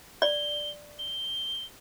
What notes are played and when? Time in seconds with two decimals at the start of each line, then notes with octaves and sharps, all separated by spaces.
0.22 D5 G7
0.99 G7